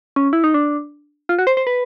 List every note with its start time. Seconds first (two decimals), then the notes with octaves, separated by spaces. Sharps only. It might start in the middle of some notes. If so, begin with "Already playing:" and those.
0.16 C#4
0.33 E4
0.44 D#4
0.54 D4
1.29 F4
1.39 F#4
1.47 C5
1.57 C5
1.67 B4